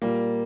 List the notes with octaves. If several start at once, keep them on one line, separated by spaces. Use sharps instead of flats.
A#2 G3 A#3